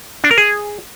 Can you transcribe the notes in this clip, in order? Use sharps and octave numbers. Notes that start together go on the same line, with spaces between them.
D4
A#4
G#4